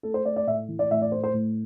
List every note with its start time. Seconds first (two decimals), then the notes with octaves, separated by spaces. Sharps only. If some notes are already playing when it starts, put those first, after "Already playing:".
0.03 A3 A4
0.14 C5
0.25 A3 D5
0.36 D5
0.47 A2 E5
0.68 E3
0.79 D5
0.91 A2 E5
1.02 D5
1.12 A3 C5
1.24 C5
1.33 A2